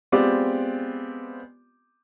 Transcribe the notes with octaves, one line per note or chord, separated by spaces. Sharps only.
G#3 B3 C4 F4 G4 D5